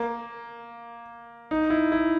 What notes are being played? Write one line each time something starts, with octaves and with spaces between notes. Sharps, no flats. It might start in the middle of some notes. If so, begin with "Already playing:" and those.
Already playing: A#3
D#4
E4
E4